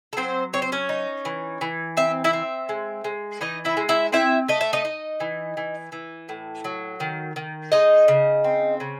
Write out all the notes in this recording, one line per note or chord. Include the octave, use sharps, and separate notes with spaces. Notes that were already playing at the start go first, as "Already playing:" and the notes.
A4
F#3 C4 C5
C4 C#5
C5
C#4 C#5
D#4
E3
E3
C4 E5
E4 E5
C4
G#3
G#3
E3 D#4 D#5
E4 E5
G#3
E4 E5
C4 E4 E5
A3 D#5
E5
D#4 D#5
D#4
E3
E3
E3
A2
F#3
D#3
D#3
G#3 D#4 D#5
C#3
C4
C#3